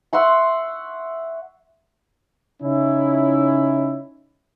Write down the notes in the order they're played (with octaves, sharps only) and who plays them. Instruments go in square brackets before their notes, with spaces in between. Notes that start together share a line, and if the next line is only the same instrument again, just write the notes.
[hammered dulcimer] E5 F#5 C6 C#6
[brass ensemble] C#3 C#4 D#4 E4